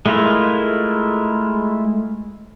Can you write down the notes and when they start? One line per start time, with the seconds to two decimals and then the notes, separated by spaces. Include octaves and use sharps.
0.06 G#3 A3 E4 F4 A#4